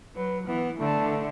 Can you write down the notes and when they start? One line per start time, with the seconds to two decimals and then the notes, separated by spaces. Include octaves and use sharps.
0.16 F#3 B4
0.47 E3 B3
0.79 D3 A3